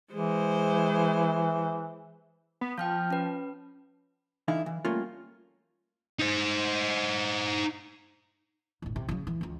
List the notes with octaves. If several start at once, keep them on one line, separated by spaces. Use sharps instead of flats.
E3 G#3 C5
B3
F3 G5 F6 G6
C#4 B4
D3 E3 D#4 E4 F5
E3
G3 A3 A#3 C#4 F4
D#4 C5
G1 A2
C3
C#3 F#3
E3
C#2 C#4